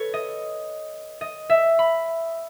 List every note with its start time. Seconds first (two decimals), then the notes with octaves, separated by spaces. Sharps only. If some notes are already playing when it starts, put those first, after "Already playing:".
Already playing: A4 B4 C#5
0.14 D#5
1.21 D#5
1.50 E5
1.79 B5